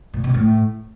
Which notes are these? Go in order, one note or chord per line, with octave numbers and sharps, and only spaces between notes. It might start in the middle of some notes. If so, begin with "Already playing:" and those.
A#2
B2
A2